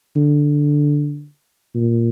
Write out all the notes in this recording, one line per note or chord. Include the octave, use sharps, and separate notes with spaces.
D3
A#2